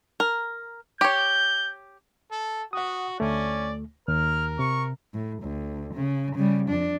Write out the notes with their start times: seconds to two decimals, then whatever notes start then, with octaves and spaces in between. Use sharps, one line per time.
0.20 A#4
1.01 G4 C#5 G6
2.31 A4
2.73 F#4 F#5 D#6
3.20 D2 A3 C#4 D5
4.08 D#2 A#4 F6
4.59 C3 C#6
5.14 A2
5.43 D2
5.94 C#3
6.36 C#3 G3
6.69 F2 D4